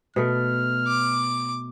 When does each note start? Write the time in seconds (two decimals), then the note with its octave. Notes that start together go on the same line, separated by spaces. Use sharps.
0.16 B2 A3 F6
0.87 D6